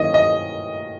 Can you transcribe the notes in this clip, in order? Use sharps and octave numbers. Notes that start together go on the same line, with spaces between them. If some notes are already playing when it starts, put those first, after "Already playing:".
Already playing: D#3 A#3 C#4 E4 D#5
D#5